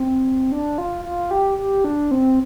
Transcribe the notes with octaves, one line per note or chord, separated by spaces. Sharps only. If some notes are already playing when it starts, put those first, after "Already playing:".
Already playing: C4
D4
F4
F4
G4
G4
D4
C4